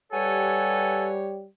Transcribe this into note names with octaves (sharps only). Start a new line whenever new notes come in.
G3 G4 A4 B4 C#5 F#5 G#5